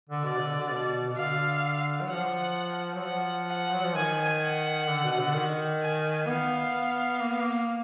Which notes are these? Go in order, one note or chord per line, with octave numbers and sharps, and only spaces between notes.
D3
B2 D5
D3
D3
B2
B2
D3 F5
F#3
F3 F#5
F#3
F3 F#5
F#5
F#3
F3
D#3 G#5
F#5
D3
B2
D3
D#3
G#5
B3 F5
A#3
B3
A#3